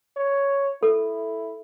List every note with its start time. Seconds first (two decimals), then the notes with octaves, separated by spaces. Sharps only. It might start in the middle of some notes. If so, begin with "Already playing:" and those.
0.17 C#5
0.83 E4 A4